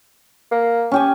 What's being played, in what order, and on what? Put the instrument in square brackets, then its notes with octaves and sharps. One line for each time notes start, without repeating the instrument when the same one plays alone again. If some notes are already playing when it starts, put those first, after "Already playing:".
[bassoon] A#3
[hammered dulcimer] C#4 G4 G#5